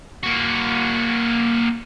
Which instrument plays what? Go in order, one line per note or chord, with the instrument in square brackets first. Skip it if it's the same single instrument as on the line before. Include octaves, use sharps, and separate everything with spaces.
[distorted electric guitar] A#3 F#4